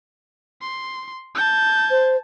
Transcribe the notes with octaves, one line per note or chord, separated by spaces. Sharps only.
C6
A5 G6
C5